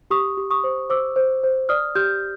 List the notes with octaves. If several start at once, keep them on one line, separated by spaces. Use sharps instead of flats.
G4 C#6 D#6
G4
C#6 D#6
C5
C5 D6 E6
C5
C5
D5 D#6 F6
G4 F6 G6